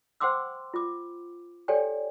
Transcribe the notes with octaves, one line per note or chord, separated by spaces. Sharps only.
C5 F#5 G5 C6 D6 E6
F4 D6
G4 A4 C#5 D5 G5 G#5